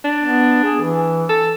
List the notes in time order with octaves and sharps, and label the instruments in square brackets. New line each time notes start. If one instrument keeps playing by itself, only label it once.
[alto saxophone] D4
[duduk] B3
G#4
E3
[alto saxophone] A4